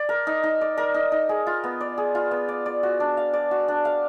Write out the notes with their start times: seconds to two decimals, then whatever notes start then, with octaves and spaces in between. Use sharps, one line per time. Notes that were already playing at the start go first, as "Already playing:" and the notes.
Already playing: D5
0.09 A#4
0.27 D#4
0.43 D#4
0.61 D5
0.77 A#4
0.94 D#4
1.12 D#4
1.29 G#4
1.47 F4
1.64 B3
1.81 D5
1.98 G#4
2.15 F4
2.31 B3
2.49 D5
2.66 D5
2.83 F#4
3.00 D4
3.17 F5
3.33 D5
3.51 F#4
3.68 D4
3.85 F5